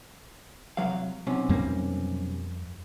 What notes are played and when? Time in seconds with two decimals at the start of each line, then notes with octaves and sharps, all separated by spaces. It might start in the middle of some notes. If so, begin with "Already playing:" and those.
0.77 C2 F#3 F5
1.27 B1 C3 C#4
1.49 F2 G3 A#3